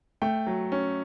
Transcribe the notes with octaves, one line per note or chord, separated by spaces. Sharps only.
A3 G5
F#3
C#4